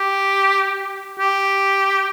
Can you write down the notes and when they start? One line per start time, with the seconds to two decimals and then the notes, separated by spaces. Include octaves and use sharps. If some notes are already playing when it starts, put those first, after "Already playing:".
Already playing: G4
1.19 G4